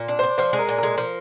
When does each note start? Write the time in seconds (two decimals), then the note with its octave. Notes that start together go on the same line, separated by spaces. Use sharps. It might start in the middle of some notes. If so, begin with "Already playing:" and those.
Already playing: A#2
0.08 D4
0.19 D4 C5
0.38 F3 C5
0.53 G#3
0.59 A#4
0.69 A#2
0.78 G#3 A#4
0.98 F3